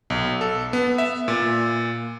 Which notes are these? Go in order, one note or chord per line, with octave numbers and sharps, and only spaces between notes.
B1
A4
B3
E5
A#2